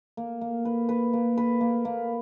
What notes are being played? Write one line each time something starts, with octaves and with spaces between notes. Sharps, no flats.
A#3
A#3
B4
B4
A#3
B4
A#3
A#3